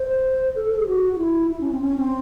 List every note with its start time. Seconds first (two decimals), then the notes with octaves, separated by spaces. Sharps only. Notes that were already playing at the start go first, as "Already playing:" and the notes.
Already playing: C5
0.56 A4
0.70 A4
0.79 G#4
0.87 F#4
1.13 F#4
1.18 E4
1.51 E4
1.61 C#4
1.71 C4
1.82 C#4
1.97 C4